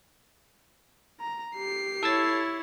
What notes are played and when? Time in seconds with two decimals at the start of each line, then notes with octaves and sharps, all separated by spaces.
1.20 A#5
1.56 G4 C7
2.03 E4 A4 C#5 E6 A6